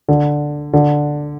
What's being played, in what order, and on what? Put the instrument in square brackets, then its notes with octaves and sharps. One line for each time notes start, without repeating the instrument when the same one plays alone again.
[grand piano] D3
D3